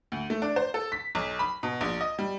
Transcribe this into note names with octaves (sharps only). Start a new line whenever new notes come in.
D2
A3
D4
C5
A4
B6
B1
B5
B2
A#1
D#5
G3